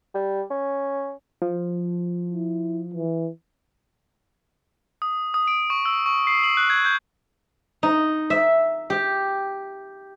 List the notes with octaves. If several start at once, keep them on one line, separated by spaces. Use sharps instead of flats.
G3
C#4
F3
E4
E3
D#6
D#6
D7
C#6
E6
C#6
C7
F#7
F#6
G#6
G6
D#4
E5
G4